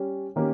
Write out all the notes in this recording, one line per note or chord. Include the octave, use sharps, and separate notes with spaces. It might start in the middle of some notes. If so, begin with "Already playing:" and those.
Already playing: G3 C#4
D#3 A#3 C#4 G4